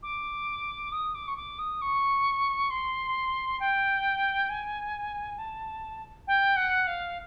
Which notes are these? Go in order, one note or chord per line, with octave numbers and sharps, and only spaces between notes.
D6
D#6
D6
C#6
D6
D#6
C#6
C6
G5
G#5
A5
G5
F#5
F5